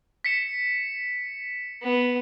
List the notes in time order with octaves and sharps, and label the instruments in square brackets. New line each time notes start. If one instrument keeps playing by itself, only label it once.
[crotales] B6 C#7 E7
[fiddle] B3